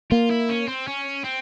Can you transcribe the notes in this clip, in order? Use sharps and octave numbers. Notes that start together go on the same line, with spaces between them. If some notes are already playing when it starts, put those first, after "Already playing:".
A#3 F4
E4
C#4
C4
C#4
C4